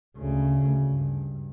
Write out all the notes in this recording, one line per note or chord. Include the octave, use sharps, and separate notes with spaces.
D2 C#3
G2